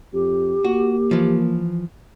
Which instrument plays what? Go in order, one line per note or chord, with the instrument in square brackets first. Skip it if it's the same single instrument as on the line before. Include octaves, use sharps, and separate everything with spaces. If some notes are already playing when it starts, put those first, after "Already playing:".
[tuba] F2 [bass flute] G4
[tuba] A#3 [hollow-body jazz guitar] F#4
[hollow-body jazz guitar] E3 F3